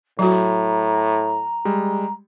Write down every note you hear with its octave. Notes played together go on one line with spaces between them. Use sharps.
A2 F#3 F#4 A#5
G3 G#3